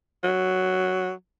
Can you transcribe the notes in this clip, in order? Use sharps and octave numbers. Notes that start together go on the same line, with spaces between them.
F#3